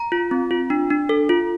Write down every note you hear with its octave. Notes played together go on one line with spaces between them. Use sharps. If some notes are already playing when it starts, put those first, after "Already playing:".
Already playing: A#5
F4
C4
F4
D4
D4
A4
F4